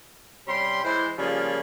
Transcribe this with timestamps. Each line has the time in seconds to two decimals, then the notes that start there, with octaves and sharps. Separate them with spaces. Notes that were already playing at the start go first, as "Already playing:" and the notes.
0.47 C3 G3 C#4 G5 B5 C6
0.84 E3 G#3 C5
1.17 C#3 F3 G3 A#3 F4 G#4